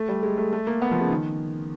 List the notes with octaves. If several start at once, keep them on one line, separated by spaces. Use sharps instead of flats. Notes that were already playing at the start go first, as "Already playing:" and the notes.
Already playing: A3
G3
G#3
A3
A3
A#3
B3
F3
C#3
D#3